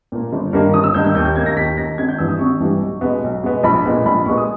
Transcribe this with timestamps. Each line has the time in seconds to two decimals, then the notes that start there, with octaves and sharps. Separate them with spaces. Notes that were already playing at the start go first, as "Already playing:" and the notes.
0.12 A#2 A#3
0.33 G1
0.53 G2 D#3 A#3
0.74 G1 D#6
0.84 E6
0.94 G2 D#3 A#3 G6
1.05 G6
1.15 D#2 G6
1.25 G6
1.36 D#3 A#3 G#6
1.46 A#6
1.56 D#2 B6
1.77 D#3 A#3 A#6
1.98 G#1 G#6
2.09 G6
2.18 G2 E3 G3 B3 E6
2.29 D#6
2.39 G#1 C#6
2.60 G2 E3 G3 B3
2.81 B1
3.01 B2 G#3 B3
3.23 B1
3.43 B2 G#3 B3
3.63 A#1 B5
3.85 A#2 G#3 B3
4.05 A#1 B5
4.26 A#2 G#3 B3 C#6
4.38 D#6